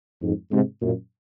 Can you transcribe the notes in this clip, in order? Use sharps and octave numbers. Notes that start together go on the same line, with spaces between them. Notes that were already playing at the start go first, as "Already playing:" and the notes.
F2 G#2
G#2 C3
F#2 A#2